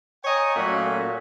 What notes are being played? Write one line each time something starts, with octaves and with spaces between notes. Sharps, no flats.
C#5 D#5 G5 G#5 A#5
A#2 F#3 A3 C#4 F#4